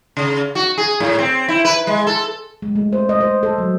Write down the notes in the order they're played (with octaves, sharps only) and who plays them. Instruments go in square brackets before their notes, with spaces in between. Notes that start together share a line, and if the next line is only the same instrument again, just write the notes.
[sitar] C#3
F#4
G#4
A2
C4
E4
B4
G#3
A4
[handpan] G#3
A3
C5
D#5
C5
A4
F#3